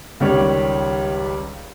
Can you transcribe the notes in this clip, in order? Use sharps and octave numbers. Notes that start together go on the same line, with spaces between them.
C#2 D#3 G3 C#5